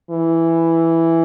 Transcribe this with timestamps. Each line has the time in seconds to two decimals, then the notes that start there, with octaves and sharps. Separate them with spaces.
0.10 E3